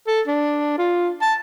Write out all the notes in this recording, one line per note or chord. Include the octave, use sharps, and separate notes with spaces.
A4
D4
F4
A5